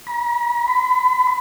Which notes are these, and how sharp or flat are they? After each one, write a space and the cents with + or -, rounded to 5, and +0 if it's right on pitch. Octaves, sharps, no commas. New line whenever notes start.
B5 -45
B5 +25